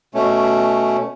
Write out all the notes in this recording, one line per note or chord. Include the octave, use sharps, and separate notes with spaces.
B2 A3 C#4